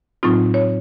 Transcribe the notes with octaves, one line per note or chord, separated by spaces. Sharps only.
A2 F#3 C4 D#4 F4
C#5